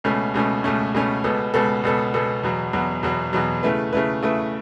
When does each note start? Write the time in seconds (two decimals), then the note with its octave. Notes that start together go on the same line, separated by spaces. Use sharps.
0.04 C#2 B2 A3 C#4
0.34 C#2 B2 A3 C#4
0.64 C#2 B2 A3 C#4
0.94 C#2 B2 A3 C#4
1.24 C#2 B2 B3 A4
1.54 C#2 B2 B3 A4
1.83 C#2 B2 B3 A4
2.14 C#2 B2 B3 A4
2.43 E2 B2 F#3
2.73 E2 B2 F#3
3.03 E2 B2 F#3
3.33 E2 B2 F#3
3.63 C#3 A3 E4 B4
3.93 C#3 A3 E4 B4
4.22 C#3 A3 E4 B4